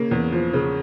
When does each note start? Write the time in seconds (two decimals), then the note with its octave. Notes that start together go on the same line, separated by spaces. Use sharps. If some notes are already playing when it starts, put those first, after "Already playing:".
Already playing: C#3 A#3
0.11 E2
0.32 F3
0.53 C#3